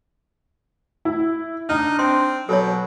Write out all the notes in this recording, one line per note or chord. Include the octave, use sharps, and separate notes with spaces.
E4
D4 D#4 F6
C4 C6
B2 F#3 A4 C#5